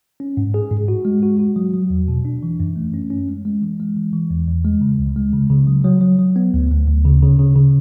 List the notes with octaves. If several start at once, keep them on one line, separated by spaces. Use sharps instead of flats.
C#4
G#2
G#4
G#2
F#4
G#3
F#4
F#4
F#3
F#3
E2
B2
D4
E3
F#2
A3
C#4
C#4
G#3
G#3
E3
G#3
E3
E3
E2
E2
G#3
C#3
C#2
G#3
C#3
C#3
F#3
F#3
F#3
F#3
B3
D2
D2
D2
C#3
C#3
C#3
C#3